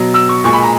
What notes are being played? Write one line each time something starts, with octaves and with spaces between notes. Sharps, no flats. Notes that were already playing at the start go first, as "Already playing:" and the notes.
Already playing: B2 F#3
E6
C#6
A#2 G#3 C#6
B5
A#5